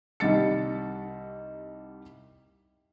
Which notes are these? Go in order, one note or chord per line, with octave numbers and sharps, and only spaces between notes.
C2 D#3 G3 D#5 A6 C#7